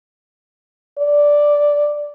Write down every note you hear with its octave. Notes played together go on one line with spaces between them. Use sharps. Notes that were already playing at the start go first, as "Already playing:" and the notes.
D5